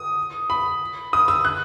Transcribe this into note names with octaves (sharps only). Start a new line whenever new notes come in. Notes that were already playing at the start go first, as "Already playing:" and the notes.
Already playing: D#6
B5
D#6
E6
F#6